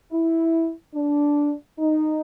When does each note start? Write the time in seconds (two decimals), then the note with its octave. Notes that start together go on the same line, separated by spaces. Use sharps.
0.12 E4
0.95 D4
1.79 D#4